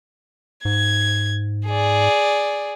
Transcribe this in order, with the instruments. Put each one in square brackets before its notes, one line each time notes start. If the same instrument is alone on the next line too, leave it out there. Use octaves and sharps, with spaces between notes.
[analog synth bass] G#2 [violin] G#6
[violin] G#4 D5